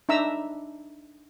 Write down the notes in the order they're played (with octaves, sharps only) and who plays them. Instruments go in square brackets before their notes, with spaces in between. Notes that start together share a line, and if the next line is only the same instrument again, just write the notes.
[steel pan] D4 D#4 E5 A#5 E6